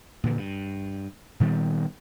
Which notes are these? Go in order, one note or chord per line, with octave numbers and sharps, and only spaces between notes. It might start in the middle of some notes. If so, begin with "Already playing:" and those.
A#2 D3 E3
G2
A#2 D#3 G3 B3